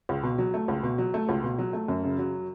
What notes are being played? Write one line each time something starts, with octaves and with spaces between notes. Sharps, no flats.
C#2
B2
F#3
A3
C#2
B2
F#3
A3
C#2
B2
F#3
A3
F#2
C#3
F#3